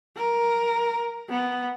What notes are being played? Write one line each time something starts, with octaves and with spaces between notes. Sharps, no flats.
A#4
B3